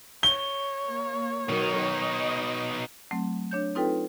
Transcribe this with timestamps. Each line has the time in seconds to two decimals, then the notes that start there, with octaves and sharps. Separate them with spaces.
0.23 C#5 G7
0.86 A#3
1.49 B2 D#3 F#3 D#4
1.94 D#5
3.11 F#3 A3 C4
3.51 D4 C#5 G6
3.75 C4 D#4 F4 A4 B4 G5